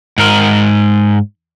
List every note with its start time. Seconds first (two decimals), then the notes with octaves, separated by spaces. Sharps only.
0.18 G#2 A#4